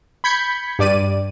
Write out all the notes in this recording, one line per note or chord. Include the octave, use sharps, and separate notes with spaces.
B5 G6 G#6 B6 C#7
G2 D5 D#7